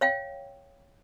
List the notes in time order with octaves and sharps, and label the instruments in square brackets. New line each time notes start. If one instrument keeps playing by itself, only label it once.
[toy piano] C#5 F5 G5